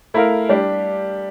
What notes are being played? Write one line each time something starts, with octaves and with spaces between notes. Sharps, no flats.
A3 E4 A#4 F5
G3 D4 G4